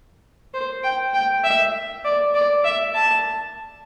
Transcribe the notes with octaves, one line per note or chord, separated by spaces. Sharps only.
C5
G5
G5
E5
D5
D5
E5
A5